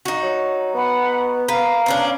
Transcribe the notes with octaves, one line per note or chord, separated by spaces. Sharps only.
D#4 F#4
F#3
B3 F#5 B5
B4 F5 A#5
B3 C#4 D4